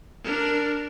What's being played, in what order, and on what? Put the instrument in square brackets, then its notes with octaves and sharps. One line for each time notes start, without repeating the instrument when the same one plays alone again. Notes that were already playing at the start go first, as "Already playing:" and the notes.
[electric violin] D4 A#4